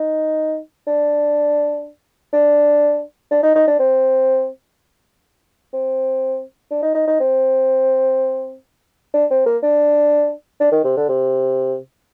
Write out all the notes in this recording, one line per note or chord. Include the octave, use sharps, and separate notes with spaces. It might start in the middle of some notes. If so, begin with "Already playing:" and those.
Already playing: D#4
D4
D4
D4
D#4
D#4
D4
C4
C4
D4
D#4
D#4
D#4
C4
D4
C4
A#3
D4
D4
D#3
C3
D3
C3